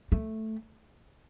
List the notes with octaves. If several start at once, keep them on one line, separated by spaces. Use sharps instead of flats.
A3